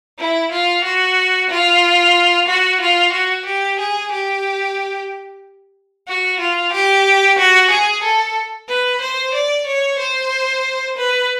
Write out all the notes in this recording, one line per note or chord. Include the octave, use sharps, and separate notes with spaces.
E4
F4
F#4
F4
F#4
F4
F#4
G4
G#4
G4
F#4
F4
G4
F#4
G#4
A4
B4
C5
D5
C#5
C5
B4